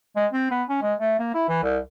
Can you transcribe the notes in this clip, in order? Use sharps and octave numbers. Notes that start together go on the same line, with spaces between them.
G#3
C4
B3
C#4
G#3
A3
A#3
E4
E3
C2